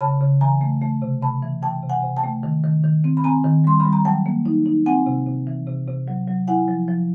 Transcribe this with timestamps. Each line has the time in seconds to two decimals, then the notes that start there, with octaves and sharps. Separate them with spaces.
0.01 C#3 A5 B5
0.21 C#3
0.41 E3 G#5 A#5
0.61 A3
0.82 A3
1.02 C3
1.22 C3 A5 B5
1.42 E3
1.62 E3 G5 A5
1.83 C3
1.90 F#5 G#5
2.03 C3
2.17 G5 A5
2.24 A3
2.43 D#3
2.64 D#3
2.84 D#3
3.04 C4
3.17 B5
3.24 C4 G#5 A#5
3.44 D#3
3.64 G3 C6
3.80 B5
3.85 G3
3.93 A#5
4.05 F#3 G5 A5
4.26 A#3
4.46 D#4
4.66 D#4
4.86 C4 F#5 G#5
5.06 C3
5.26 C3
5.47 E3
5.67 C3
5.87 C3
6.08 F#3
6.28 F#3
6.48 E4 F#5 G#5
6.68 F3
6.88 F3